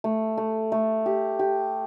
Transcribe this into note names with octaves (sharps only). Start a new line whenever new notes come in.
A3
A3
A3
G4
G4